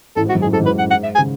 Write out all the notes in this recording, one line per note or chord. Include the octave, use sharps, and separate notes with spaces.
A1 A2 A4
G#2
F#4
F#2
A2 G#4
G#2 A4
F#2
G#2 B4
F#5
F#5
E5
G#5
C#3